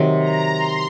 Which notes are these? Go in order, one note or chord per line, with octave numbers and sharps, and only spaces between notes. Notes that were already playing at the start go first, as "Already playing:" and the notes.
Already playing: C3 D#3 F#3
A#5
C6